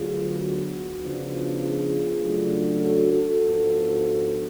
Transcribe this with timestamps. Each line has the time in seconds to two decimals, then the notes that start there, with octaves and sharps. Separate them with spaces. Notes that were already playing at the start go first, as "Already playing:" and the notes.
Already playing: D2 D3 F#3 B3 F4 G#4
0.39 F#4
1.00 C#3 F3 B3 D4
1.61 F4 G#4
2.21 C#3 F#3 A3 D4
2.81 F#4 A4
3.12 F#4 A4
3.43 G#2 F3 B3 D4